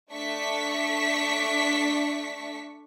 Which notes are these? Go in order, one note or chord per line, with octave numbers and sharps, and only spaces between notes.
A3 D4 C#6 B6